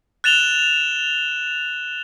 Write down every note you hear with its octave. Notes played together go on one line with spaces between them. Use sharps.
F#6 A6 E7 F7 G7